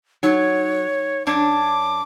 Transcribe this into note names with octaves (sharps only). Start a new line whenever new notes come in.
F#3 D#4 C#5
F#2 D4 C#5 D6